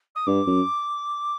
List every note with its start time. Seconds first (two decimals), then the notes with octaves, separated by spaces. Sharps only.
0.15 D#6
0.26 G2 D6
0.47 F#2